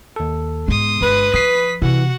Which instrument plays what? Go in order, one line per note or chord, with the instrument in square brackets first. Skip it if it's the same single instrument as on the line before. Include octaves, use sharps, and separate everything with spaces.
[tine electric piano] D#2 A4
[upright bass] G#2 B3 [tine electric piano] G#3 [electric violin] C6 D#6
[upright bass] G1 [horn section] B4
[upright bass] F3 [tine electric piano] D#6 C7 [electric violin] B6
[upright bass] C3 [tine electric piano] E3 [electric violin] F#4 F#5